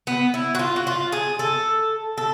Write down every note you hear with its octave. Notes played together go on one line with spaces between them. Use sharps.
B3
E4
F#4
F4
F#4
F4
G#4
A4
A4